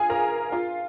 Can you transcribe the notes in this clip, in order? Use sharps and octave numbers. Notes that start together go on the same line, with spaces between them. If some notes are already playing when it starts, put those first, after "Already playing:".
Already playing: F4 G#4 F5 G#5
A#4 A#5
F4 F5